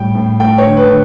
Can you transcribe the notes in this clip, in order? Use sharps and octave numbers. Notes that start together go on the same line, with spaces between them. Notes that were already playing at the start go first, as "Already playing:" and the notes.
Already playing: A2 G3 G5
A2
A3 G5
C#5
D3
B4
D3